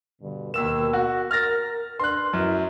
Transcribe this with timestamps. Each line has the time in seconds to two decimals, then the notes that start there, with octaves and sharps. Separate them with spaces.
0.21 G2 B2 D3
0.54 D#2 B2 A#4 E6 E7
0.93 F#4
1.31 A#4 F6 A6 A#6
2.00 D4 B4 C6 F#6
2.33 F#2 E4